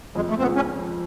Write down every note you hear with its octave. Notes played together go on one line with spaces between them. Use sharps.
F2 G#3
A3
C4
C#3 F3 G#3 B3
C#4